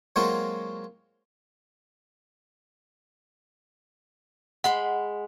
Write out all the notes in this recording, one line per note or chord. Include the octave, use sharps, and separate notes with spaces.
F#3 G#3 A#3 C4 F4 F#4
G#3 F#5 B5 C6